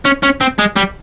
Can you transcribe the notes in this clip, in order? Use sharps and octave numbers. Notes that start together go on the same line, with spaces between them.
C#4
C#4
C4
G#3
G3